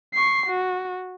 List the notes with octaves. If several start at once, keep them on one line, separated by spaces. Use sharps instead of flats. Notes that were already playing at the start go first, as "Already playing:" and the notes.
C#6 C7
F#4